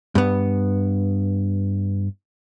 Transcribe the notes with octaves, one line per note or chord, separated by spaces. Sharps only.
G2 B3